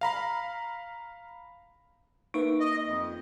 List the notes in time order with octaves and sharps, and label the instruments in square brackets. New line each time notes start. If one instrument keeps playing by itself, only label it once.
[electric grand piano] F5 A#5 B5
[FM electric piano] A#3 B4 E5 [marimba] D#4
[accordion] D#5
F2